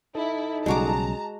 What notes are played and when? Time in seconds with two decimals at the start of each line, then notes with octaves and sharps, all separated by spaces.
0.15 D#4 E4 A4
0.66 B1 C#3 G3 G#3 F#4 A5 A#5 D6